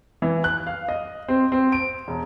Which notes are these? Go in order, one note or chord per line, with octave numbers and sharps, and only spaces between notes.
E3
F#6
F5
D#5
C4
C4
D7
E1